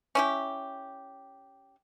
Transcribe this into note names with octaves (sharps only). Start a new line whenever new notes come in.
C#4 E4 G4